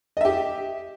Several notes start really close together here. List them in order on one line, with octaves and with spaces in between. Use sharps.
D#5 E5 G4